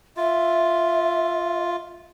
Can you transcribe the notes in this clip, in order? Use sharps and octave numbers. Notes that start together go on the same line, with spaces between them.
F4 E5